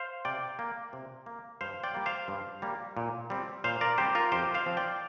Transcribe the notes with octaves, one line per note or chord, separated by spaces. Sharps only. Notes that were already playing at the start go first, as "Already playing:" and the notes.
Already playing: C5 F5
C3 D5 G5
A#3
C3
A#3
G2 C5 F5
D5 G5
G3 A#3
C5 F5
G2
G3 A#3
A#2
G3 C4
A#2 C5 F5
A#4 D5
G3 C4 G4 C5
F4 A#4
F2 G4 C5
C5 F5
F3 C4
D5 G5